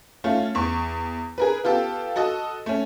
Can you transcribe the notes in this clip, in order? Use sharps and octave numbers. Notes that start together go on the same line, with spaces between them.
A3 C#4 F4
E2 C#6
G#4 A#4 B4
B3 F4 G4 A4
F#4 A4 D#5
A3 C#4